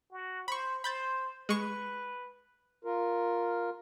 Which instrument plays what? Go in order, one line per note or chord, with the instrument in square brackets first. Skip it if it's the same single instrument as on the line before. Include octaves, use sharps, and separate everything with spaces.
[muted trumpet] F#4
[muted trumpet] C5 [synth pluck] B5 C#6
[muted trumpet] C5 [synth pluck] B5 G6 A6
[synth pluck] G#3 C#6 C#7 [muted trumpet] B4
[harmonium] F4 A#4